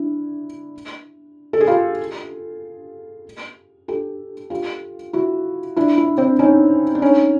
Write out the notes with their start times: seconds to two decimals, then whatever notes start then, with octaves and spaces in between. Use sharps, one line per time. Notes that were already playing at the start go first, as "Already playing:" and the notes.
Already playing: D4 E4
1.53 A4
1.61 G#4
1.67 F4 G4
3.88 G4 A4
4.50 F4 G4
5.13 E4 F#4
5.76 D4 E4
5.98 D4 E4
6.18 C4 D4
6.39 C#4 D#4
6.95 D4
7.02 C#4 D#4